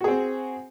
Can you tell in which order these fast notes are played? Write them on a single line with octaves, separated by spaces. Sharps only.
F#4 G#4 C4